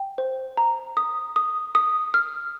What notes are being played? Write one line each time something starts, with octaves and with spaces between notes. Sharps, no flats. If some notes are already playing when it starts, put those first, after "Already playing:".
Already playing: G5
C5
A#5
D#6
D#6
D#6
F6